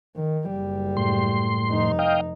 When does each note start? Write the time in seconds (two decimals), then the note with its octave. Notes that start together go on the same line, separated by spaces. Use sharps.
0.16 D#3
0.49 F#1 G3
0.97 A2 C6
1.68 F1 D#4
1.99 D#5 F5 G5